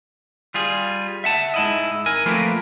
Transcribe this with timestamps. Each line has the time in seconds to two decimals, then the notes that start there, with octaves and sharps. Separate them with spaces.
0.54 G3 F4 G#4
1.24 E5 F#5 A5
1.54 G#2 E4 D#5
2.06 A#4 G#5
2.26 F3 A3 A#3 C4 A#4 B4